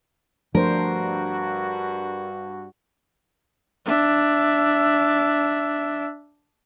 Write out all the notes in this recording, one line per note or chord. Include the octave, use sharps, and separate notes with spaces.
G2 F3 A3 D4 F#4 A#4 C5
D4 E5